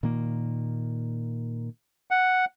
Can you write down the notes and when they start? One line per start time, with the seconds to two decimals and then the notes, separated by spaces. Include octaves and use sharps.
0.03 A#2 D#3 A#3
2.11 F#5